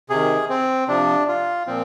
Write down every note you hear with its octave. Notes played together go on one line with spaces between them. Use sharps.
C3 D#3 G#4
C4
C3 F3 D4
F4
A#2 F3 C4